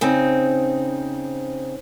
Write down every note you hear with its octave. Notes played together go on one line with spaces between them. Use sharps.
C#3 C4 D#4